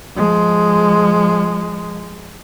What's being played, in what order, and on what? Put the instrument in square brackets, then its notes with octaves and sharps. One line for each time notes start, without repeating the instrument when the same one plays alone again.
[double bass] F3 G#3